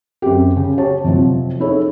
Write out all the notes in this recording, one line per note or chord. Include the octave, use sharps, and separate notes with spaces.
F#2 C4 G4
C#3
G4 C#5 A5
F2 C3 F3 F#3
D#4 E4 G#4 A4 C#5